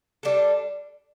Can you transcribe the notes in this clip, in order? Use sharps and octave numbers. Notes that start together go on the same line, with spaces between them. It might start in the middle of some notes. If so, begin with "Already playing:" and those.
G3 D4 A4